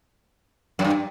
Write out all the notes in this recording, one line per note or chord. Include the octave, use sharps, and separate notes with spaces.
F#2
G2